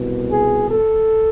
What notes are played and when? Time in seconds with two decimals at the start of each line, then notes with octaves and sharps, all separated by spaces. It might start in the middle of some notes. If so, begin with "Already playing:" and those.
Already playing: C2 B2
0.30 G#4
0.69 A4